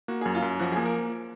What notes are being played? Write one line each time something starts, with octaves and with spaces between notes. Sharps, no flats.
A#3 F#4
F#2 G#4
F4
F#2
F3 F#4
A#3 G#4
A#4